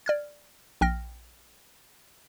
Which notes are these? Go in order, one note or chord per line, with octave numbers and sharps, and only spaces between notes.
D5 F6 G#6
A#1 G5 F6 A#6